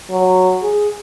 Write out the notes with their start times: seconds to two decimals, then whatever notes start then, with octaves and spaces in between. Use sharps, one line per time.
0.11 F#3
0.63 G#4